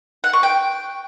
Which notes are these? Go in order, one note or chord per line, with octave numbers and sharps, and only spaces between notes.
F#5
C#6
G5